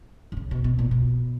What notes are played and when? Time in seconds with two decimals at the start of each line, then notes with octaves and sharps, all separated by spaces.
0.32 D3
0.37 C#3
0.51 B2
0.64 B2
0.79 A#2
0.91 B2